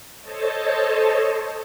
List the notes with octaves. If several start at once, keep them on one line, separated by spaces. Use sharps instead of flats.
A4 C5 C#5 D#5 A5